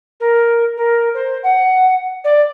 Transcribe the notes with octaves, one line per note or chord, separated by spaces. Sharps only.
A#4
A#4
C5
F#5
D5